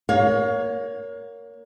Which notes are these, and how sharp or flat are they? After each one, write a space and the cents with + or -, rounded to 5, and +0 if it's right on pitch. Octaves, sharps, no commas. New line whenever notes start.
A#3 +0 C#5 +20 F5 +35